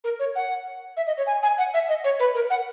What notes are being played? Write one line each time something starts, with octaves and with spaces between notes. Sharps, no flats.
A#4
C#5
F#5
E5
D#5
C#5
G#5
G#5
F#5
E5
D#5
C#5
B4
A#4
F#5